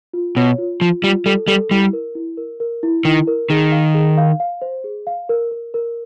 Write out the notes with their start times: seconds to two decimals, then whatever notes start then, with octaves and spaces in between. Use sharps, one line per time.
0.13 F4
0.37 B2 C#5
0.58 F4
0.81 F3 F4
1.03 G3 F4
1.26 G3 A4
1.48 G3 A4
1.70 G3 E4
1.93 A#4
2.15 E4
2.37 A#4
2.60 A#4
2.83 E4
3.05 D#3 E4
3.27 A#4
3.50 D#3 G#4
3.72 F5
3.95 G#4
4.18 F5
4.40 F5
4.62 C5
4.84 G#4
5.07 F5
5.29 A#4
5.51 A#4
5.74 A#4